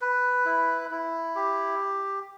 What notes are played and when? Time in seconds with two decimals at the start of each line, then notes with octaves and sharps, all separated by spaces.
0.01 B4
0.45 E4
0.91 E4
1.35 G4